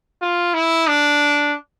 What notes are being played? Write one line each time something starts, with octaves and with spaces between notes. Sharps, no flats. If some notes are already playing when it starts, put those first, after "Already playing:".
F4
E4
D4